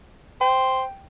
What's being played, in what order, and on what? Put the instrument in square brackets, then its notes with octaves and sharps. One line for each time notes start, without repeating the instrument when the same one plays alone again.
[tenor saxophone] C5 [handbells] G5